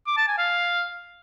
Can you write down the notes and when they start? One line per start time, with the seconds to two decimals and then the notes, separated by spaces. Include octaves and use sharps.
0.07 D6
0.17 A5
0.28 G#5
0.38 F5